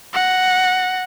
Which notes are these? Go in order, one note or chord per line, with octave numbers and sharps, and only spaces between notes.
F#5 A#6